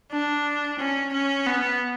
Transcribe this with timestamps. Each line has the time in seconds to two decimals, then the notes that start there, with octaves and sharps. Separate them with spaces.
0.11 D4
0.79 C#4
1.13 C#4
1.47 B3